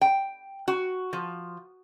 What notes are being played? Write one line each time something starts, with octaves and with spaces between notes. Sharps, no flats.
G5
F#4
F3